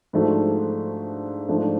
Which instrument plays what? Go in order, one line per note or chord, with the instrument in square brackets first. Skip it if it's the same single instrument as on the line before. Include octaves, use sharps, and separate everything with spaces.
[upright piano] G#2 F3 A3 D4 F#4
G#2 F3 A3 D4